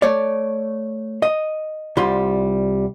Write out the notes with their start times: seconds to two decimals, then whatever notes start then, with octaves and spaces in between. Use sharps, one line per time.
0.02 A3 C#5 D5
1.22 D#5
1.97 C2 G3 F4 C6